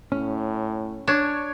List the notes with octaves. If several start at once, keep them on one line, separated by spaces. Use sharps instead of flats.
A2 C#4
D4 C#5